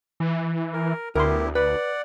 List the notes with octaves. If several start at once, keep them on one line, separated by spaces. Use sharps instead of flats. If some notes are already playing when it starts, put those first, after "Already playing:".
E3
A#4
D2 B3 E4 G4 A#4 C6
B4 D5 F#5